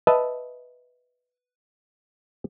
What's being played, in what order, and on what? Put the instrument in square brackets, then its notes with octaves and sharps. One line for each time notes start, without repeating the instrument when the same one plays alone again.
[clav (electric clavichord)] B4 D#5 E5 A5